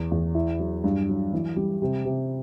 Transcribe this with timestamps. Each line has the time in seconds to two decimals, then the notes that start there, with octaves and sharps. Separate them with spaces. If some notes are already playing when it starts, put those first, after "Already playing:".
Already playing: E2
0.12 E2
0.35 E4
0.59 F#3
0.84 G2
1.09 F#3
1.33 E3
1.56 G3
1.82 C3
2.05 C3